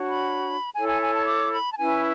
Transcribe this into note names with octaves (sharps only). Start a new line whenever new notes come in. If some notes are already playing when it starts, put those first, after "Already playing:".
Already playing: D4 F#4 C#5
B5
E4 A4 C#5 G#5
G#5
G#5
A5
D6
B5
A5
C#4 E4 B4 G#5